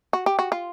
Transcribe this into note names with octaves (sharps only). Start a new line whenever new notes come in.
F#4
G4
F#4
F4